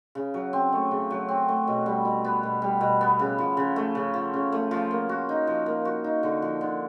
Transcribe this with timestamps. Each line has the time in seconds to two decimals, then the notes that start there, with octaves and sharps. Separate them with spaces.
0.15 C#3
0.34 F#3
0.53 C4
0.73 A3
0.91 C#3
1.10 F#3
1.28 C4
1.48 A3
1.67 B2
1.86 G3
2.05 B2
2.24 B3
2.43 B2
2.62 G3
2.81 B2
3.01 B3
3.19 C#3
3.38 F3
3.57 C#3
3.76 A3
3.95 C#3
4.14 F3
4.34 C#3
4.52 A3
4.71 F3
4.91 A#3
5.09 F#4
5.29 D#4
5.47 F3
5.66 A#3
5.85 F#4
6.04 D#4
6.23 D3
6.42 F3
6.61 D3